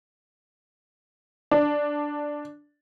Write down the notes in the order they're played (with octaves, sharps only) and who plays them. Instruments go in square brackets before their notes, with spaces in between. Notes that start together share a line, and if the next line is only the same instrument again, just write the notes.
[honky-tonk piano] D4